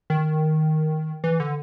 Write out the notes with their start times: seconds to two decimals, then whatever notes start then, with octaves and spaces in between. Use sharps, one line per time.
0.10 D#3
1.24 E3
1.40 D3